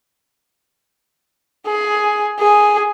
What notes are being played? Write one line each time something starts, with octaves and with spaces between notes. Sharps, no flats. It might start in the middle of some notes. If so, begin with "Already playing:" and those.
G#4
G#4